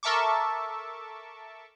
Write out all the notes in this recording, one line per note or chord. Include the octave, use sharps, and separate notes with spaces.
A4 A#4 E5 A5 C#6 D6